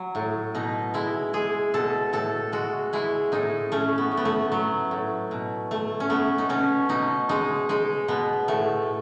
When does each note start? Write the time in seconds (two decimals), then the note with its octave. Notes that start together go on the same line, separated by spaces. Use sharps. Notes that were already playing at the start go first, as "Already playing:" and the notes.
Already playing: F#3
0.15 A2
0.55 B2 D#4
0.94 G#3 E4
1.33 G#3 G#4
1.74 B2 A4
2.13 A2 A4
2.52 G#3 F#4
2.93 G#3 E4
3.32 A2 D#4
3.72 A3 C#4
3.98 B3
4.11 A2
4.17 B3
4.25 A3
4.52 F#3
4.91 A2
5.31 B2
5.71 A3
6.00 C#4
6.10 A3 B3
6.38 D#4
6.49 B2 C#4
6.89 B2 D#4
7.29 G#3 D#4
7.69 G#3 D#4
8.08 B2 B3
8.48 A2 A3